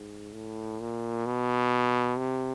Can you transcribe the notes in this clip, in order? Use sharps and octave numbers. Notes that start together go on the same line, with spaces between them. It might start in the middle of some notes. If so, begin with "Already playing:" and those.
Already playing: G#2
A2
A#2
B2
C3